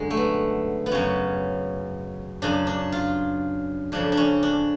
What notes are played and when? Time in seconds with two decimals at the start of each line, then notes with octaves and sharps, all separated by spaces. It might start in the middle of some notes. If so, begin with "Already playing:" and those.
Already playing: F#2 D3 G#3
0.10 A3
0.17 B3
0.86 B3
0.91 F#2 C#3 C#4
2.42 F#2 C#3 D4
2.67 D4
2.92 F4
3.92 F2 C#3 D4
4.12 D4
4.17 C#4
4.43 D4